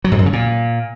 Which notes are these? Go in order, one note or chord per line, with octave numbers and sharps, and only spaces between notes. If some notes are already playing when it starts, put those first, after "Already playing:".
F#3
G#2
F#2
C#3
A#2